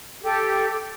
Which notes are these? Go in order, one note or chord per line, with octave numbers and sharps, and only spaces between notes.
G4 A4